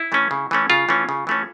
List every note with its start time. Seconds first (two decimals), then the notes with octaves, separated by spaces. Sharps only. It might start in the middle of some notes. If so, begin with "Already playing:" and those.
Already playing: E4
0.12 E3 A3 C#4
0.31 C#3
0.51 E3 A3 C#4
0.70 C#3 F4
0.89 E3 A3 C#4
1.09 C#3
1.27 E3 A3 C#4